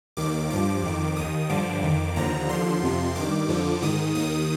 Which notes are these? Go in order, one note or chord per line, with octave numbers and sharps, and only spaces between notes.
D#2 D#3 D6
G2 F3 D6
F2 D#3
D#2 D#3 D#6
G2 D3 F3 D6
F2 D#3
D#2 D3 F3 A#5
D#2 D3 F3 C6
F2 C3 F3
G2 D#3 D6
F2 D3 F3
G#2 D#3 D#6
D#2 D#3 D#6